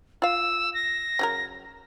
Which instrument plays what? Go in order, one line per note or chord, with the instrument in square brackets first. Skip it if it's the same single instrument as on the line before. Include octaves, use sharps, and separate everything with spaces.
[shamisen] F4 F5 [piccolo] E6
[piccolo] A#6
[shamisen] C#3 F#3 A#4